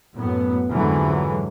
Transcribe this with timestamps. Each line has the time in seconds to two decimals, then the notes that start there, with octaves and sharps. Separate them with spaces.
0.17 F#2 A2 B3
0.71 F2 G#2 D3 E3 F#3 G#3